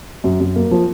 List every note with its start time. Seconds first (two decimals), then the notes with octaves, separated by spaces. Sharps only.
0.24 F#2
0.40 F#2
0.56 A#3
0.71 F3